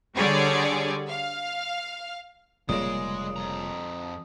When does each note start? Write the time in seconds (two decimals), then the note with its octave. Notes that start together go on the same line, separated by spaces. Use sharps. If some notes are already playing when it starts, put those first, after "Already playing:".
0.16 D3 G3 G#4 C#5 D5
1.09 F5
2.69 F1 A#2 C#3 G3 G#3 A#3 D#6
3.36 F2 A#5